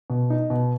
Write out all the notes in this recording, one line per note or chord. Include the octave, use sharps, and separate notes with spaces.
B2
D#4
B2